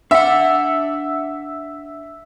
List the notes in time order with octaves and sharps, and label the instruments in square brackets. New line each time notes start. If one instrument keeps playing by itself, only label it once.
[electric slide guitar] D4 F#5 [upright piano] E5